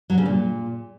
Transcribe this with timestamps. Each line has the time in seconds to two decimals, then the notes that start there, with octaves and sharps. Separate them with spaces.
0.10 F#3
0.18 C#3
0.26 A#2